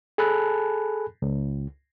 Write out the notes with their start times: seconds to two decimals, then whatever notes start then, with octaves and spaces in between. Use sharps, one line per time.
0.18 G#4 A4 G#5 A5 B5 F#6
1.22 C#2